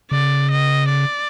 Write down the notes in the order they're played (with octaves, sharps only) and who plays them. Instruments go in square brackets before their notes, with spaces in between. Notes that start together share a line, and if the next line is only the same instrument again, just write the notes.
[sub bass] C#3 [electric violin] D5
[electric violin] D#5
D5